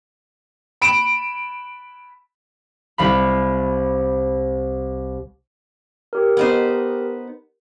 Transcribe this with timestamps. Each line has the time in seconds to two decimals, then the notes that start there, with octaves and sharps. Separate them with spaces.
0.82 B5 D7 E7
2.98 C2 F5 B5
6.13 G4 A#4
6.37 B3 D#4 C5